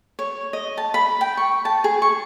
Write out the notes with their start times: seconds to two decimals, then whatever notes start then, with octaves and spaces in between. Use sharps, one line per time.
0.19 C#5
0.53 D#5
0.78 A5
0.94 B5
1.21 G5
1.37 C#6
1.65 A5
1.84 G#4
2.02 C#6